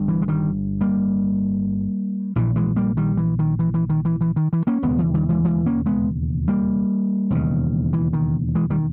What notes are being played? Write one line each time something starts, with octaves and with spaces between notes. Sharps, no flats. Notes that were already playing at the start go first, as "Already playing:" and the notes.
Already playing: G1 G2
E3
G#3
D#3 G3
G3 A#3
A#1 A#2 E3
E3 G#3
G3 A#3
D#3 G3
E3
D#3
E3
E3
D#3
E3
E3
D#3
E3
A#3 C#4
E1 D#2 C#3 G#3 B3
E3
D#3 G3
E3 G#3
E3 G#3
A#3 C#4
G#3 B3
G3 A#3
E1 D#2 C#3
E3
D#3
E3 G#3
D#3 G3